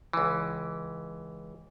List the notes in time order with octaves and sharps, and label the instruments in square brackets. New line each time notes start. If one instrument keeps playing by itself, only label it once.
[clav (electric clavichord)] C#2 E3